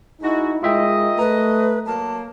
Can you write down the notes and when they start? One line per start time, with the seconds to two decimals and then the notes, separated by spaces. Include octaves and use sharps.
0.21 G#3 D#4 E4 F#4
0.63 G#3 F4 A#4 D#5 E5 G5
1.19 A3 B4 A#5
1.86 F#3 A#3 A5